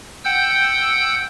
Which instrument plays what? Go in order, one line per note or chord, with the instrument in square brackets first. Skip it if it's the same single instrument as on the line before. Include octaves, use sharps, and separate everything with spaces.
[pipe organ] F#5 G5 E6 G6